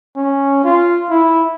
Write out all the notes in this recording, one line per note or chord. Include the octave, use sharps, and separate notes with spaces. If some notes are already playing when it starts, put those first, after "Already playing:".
C#4
F4
E4